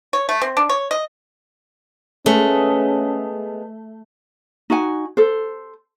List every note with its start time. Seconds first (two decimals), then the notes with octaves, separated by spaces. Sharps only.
0.13 C#5
0.29 A3
0.42 C4
0.57 D4
0.69 C#5
0.91 D#5
2.26 G#3 A3 B3 C#4 G#4
4.70 D#4 F#4 F#5 G#5
5.17 A4 C5